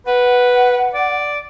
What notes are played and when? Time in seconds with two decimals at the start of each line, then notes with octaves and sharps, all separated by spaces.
0.06 B4 F#5
0.94 D5